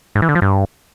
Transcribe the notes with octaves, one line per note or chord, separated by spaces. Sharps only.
G#2
E3
D3
F3
G2